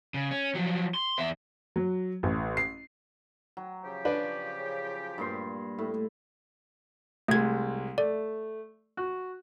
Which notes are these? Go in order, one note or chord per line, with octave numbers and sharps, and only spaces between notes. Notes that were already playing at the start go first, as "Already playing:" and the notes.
C#3
C#4
F3 F#3
C6
E2 E5
F#3
A1
C7
F#3
C#3 F3 G4
D4 B4
G2 A#2 C6
A2
C2 G#3 A3 G#6
A3 D5
F#4